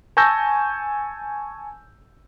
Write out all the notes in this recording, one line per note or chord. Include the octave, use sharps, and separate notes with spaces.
G#5 A5 C#6 E6 G6 A#6